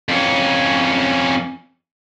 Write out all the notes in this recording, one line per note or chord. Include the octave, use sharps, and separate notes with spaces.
F2 C#4